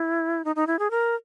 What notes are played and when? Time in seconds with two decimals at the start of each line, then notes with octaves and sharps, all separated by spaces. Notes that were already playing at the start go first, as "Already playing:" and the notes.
Already playing: E4
0.45 D#4
0.56 D#4
0.67 E4
0.79 G#4
0.91 A#4